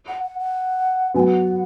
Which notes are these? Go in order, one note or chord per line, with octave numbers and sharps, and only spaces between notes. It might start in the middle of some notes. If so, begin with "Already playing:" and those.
F#5
F#5
F#5
F#3 B3 G#5
F#5